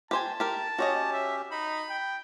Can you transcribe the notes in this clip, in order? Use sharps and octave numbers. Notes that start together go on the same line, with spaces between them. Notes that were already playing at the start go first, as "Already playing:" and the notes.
G4 C5 G#5 A5
G4 A#4
C#4 F#4 G4 C#5 D#5
E5
D#4 B5
G5